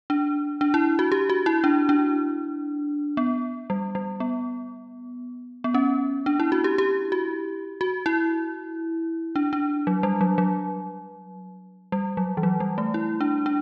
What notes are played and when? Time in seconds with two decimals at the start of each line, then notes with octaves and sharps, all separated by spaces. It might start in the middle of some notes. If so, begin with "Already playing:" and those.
0.10 D4
0.61 D4
0.74 E4
0.99 F#4
1.12 G4
1.30 F#4
1.46 E4
1.64 D4
1.89 D4
3.17 B3
3.70 G3
3.95 G3
4.20 B3
5.64 B3
5.74 C#4
6.26 D4
6.40 E4
6.52 F#4
6.64 G4
6.78 G4
7.12 F#4
7.81 F#4
8.06 E4
9.36 D4
9.53 D4
9.87 F#3
10.03 G3
10.21 F#3
10.38 F#3
11.92 G3
12.17 F#3
12.37 E3
12.43 F#3
12.60 G3
12.78 A3
12.94 E4
13.21 D4
13.46 D4